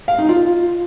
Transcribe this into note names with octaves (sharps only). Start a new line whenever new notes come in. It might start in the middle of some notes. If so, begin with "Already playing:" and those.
F5
D#4
F4